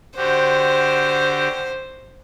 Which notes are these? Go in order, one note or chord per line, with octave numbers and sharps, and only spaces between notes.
D3 F#4 G4 C5